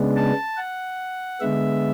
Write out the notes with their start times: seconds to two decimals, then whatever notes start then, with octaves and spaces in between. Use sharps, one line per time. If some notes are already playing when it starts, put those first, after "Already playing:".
Already playing: C#3 G#3 B3 D4
0.16 A5
0.57 F#5
1.40 D3 G#3 B3 E5